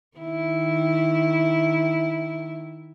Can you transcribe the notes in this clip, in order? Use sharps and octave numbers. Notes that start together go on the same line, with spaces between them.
D#3 E4